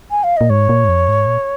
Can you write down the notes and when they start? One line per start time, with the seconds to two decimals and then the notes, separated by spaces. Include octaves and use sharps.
0.11 G#5
0.23 F5
0.37 A#2 D#5
0.50 G#2 C#5
0.69 A#2
0.84 G#2
0.89 F2
1.08 G#2
1.26 A#2